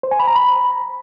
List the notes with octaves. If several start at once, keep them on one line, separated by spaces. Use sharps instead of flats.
C5
G#5
B5
A#5
B5